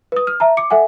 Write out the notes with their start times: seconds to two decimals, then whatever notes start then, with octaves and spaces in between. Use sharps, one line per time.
0.12 B4 D#6
0.27 F6
0.40 E5 A5 A#5
0.57 D6 C#7
0.71 A4 E5 F#5 G#5